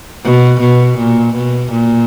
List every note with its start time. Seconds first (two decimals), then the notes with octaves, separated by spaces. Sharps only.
0.24 B2
0.60 B2
0.98 A#2
1.34 B2
1.71 A#2